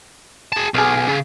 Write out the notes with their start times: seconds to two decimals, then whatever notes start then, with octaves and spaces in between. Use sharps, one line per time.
0.53 G#4 A5
0.74 B1 G#4 F5
1.09 C#3